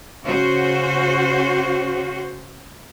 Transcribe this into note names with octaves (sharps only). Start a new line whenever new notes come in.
C#3 C#4 F#4 C5